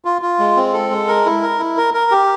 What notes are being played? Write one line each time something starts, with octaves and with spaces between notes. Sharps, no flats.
F4
F4
G#3
C4
A4
G#3
A#4
E4
A#4
E4
A#4
A#4
G4